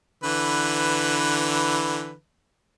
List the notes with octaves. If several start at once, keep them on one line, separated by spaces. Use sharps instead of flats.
D3 E3 B4